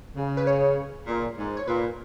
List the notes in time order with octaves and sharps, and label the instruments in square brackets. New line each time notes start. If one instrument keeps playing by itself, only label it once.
[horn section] C#3
[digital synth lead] B4
C#5
[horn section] A#2
G#2
[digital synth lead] C#5
[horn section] A#2 [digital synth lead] B4